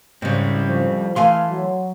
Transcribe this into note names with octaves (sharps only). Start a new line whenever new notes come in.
G#2 C#3 G3 C4
F2 F3
E3 A3 F5 G#5 C6
F#3